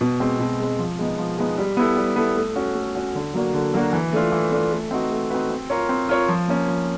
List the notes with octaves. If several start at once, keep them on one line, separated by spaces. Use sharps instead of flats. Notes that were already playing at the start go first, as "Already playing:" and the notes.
B2
G#3 C4
B2
G#3 C4
F3
G#3 B3 D#4
F3
G#3 B3 D#4
G3
B3 E4 A4
G3
B3 E4 A4
A3
C#4 F#4
A3
C#4 F#4
D3
F#3 A#3 D4 F#4
D3
F#3 A#3 D4 F#4
E3
A3 D4 F4
E3
A3 D4 F4
A3
C4 D#4 F#4 B4
A3
C4 D#4 F#4 B4
C4
F4 A#4 C#5
C4
F4 A#4 C#5
F3
A#3 C#4
F3